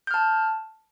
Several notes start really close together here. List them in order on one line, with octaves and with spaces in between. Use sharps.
G6 F6 A5